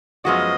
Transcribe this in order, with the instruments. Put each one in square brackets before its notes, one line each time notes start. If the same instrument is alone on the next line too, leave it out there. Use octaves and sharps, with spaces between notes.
[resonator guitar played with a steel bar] F#2 F3 G#3 B3 F#4 [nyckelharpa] D#5